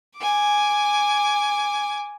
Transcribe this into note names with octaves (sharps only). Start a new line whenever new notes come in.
G#5 D6